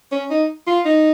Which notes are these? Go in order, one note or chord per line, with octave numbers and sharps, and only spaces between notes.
C#4
D#4
F4
D#4